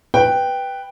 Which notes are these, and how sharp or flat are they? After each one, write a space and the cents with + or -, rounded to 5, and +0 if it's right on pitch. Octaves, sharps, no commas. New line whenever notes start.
B4 +0 G5 +0